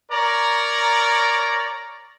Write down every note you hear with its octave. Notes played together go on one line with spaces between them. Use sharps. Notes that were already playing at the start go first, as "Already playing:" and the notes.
A#4 C#5 D5 A#5